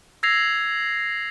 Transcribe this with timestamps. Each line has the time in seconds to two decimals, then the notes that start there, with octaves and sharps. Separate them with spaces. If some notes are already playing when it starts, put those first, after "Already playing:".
0.23 E6 G#6 A#6 C7 F7